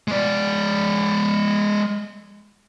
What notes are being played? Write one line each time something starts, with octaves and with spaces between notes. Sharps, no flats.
G#3 D5